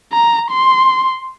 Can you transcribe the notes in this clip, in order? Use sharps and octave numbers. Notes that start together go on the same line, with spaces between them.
A#5
C6